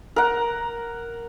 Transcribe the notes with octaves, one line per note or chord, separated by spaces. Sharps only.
A#4 F#5